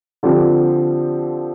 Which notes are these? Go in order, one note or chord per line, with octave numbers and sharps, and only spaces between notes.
D3 F3 C4 G4